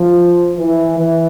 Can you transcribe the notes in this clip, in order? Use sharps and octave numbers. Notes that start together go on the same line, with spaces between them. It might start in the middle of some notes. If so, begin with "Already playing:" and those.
Already playing: F3
E3
E3